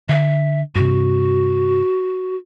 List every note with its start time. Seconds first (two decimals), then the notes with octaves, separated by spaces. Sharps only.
0.09 D3 E5
0.75 G2 C3 F#4